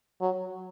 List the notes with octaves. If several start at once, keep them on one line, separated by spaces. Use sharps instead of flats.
F#3